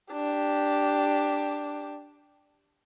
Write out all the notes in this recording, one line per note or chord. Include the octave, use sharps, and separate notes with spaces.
D4 G4